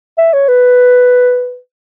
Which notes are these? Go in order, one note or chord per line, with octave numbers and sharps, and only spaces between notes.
E5
C#5
B4